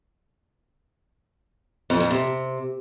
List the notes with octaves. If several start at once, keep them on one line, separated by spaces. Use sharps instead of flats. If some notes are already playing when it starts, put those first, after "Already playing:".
F2
F2
C3